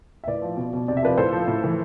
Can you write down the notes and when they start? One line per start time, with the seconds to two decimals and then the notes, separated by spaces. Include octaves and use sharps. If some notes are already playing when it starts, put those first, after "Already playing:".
0.24 E5
0.27 A2 B4 D5
0.42 F3
0.57 B2
0.73 B2
0.88 C3 D5
0.97 E5
1.03 F3 B4 D5
1.18 A2 A4 C5
1.33 F3
1.48 A2
1.64 E3